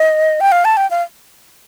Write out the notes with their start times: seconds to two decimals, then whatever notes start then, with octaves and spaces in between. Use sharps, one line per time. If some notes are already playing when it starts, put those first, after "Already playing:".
Already playing: D#5
0.41 G5
0.52 F5
0.65 A5
0.77 G5
0.91 F5